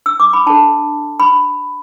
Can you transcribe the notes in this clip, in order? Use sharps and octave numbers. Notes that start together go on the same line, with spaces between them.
E6
D6
B5
D4 A4 A5
B5